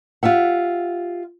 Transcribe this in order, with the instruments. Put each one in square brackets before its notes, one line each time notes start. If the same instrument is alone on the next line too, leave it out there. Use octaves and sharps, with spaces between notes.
[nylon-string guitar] F4 G4 E5 F#5